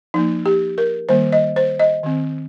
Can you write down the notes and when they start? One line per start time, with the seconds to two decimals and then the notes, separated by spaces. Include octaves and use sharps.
0.14 F3 A#3 D#4
0.46 G4
0.78 A#4
1.09 D#3 G3 A#3 C5
1.32 D#5
1.56 C5
1.80 D#5
2.03 D#3 C4